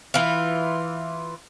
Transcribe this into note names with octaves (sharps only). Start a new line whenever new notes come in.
E3 F4